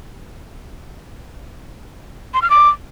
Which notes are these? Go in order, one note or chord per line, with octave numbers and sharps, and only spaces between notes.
C6
F6
D6